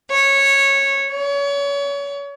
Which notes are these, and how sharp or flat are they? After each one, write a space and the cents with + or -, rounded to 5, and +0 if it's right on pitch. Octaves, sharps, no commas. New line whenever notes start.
C#5 -10
C#5 +30